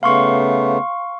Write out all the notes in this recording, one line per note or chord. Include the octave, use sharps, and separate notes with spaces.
C#3 A3 B3 F5 C6 C#6